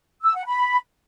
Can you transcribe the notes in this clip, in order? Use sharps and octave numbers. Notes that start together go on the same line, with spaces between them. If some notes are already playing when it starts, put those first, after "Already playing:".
E6
F#5
B5